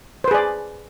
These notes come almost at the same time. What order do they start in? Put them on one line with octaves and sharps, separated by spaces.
C5 B4 G#4 D5